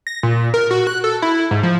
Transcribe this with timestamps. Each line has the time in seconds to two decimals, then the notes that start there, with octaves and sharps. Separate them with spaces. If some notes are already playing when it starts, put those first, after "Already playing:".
0.07 A#6
0.23 A#2
0.54 A#4
0.71 F#4
0.87 F#6
1.04 A4
1.22 E4
1.51 G#2
1.63 F3